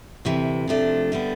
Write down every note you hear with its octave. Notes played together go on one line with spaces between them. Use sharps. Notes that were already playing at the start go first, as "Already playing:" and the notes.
D2 C3 E3
C3 F3 A3 D4
D3 G3 B3